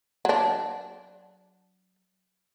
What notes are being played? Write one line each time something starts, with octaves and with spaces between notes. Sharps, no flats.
F#3 D4